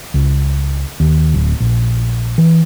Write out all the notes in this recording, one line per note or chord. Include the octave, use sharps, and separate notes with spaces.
C#2
D#2
D1
A#1
E3